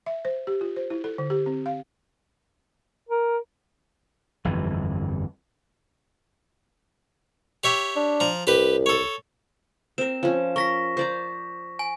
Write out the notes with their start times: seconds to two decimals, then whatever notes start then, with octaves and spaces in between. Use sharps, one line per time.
0.06 E5
0.25 C5
0.47 G4
0.61 F4
0.76 C5
0.90 E4
1.04 A4
1.18 D3
1.30 G4
1.46 C4
1.66 F5
3.09 A#4
4.45 G1 F2 E3
7.64 G4 C#5 E5
7.96 D4
8.20 F3 A#5
8.47 C2 G4 B4
8.86 A4 C#5
9.98 C4 A#4 E7
10.23 F3 C#4
10.56 A#4 C#6 A#6 B6
10.97 C5 D5 A#5
11.79 G#5